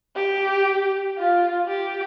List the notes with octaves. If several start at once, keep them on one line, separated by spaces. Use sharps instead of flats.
G4
F4
G4